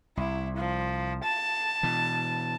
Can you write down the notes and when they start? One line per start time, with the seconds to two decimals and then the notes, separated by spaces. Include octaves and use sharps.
0.17 C2 E4
0.57 F3
1.23 A5
1.83 B2 E3